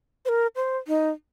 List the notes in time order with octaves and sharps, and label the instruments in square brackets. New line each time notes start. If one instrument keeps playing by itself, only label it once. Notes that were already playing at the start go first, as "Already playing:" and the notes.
[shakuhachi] C5
A#4
C5
D#4